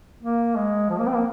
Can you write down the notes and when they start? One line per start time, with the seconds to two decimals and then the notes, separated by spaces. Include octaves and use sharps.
0.22 A#3
0.56 G#3
0.89 F3
0.98 A#3
1.07 C4
1.14 A#3